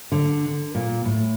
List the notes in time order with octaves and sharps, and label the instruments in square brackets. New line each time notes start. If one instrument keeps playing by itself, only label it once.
[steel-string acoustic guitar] D3
A#2
A2